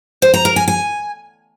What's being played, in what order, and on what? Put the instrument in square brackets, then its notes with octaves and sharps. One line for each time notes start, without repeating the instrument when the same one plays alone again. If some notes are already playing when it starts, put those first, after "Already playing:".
[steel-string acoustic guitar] C5
A#5
A#4
G#5
G#5